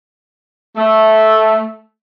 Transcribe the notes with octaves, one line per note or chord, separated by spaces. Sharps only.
A3